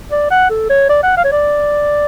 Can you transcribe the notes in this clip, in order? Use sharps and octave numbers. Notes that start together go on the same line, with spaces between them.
D5
F#5
A4
C#5
D5
F#5
F5
C#5
D5